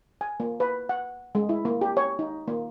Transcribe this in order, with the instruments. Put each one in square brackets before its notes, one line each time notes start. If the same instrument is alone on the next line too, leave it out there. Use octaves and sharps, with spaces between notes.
[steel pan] G#5
A#3
B4
F#5
G#3
E4
A#3
G4
C#5
D#4
A#3